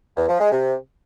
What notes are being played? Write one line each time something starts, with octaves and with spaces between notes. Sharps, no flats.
E2
F3
G#3
C3